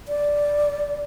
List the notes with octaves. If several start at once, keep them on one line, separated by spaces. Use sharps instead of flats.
D5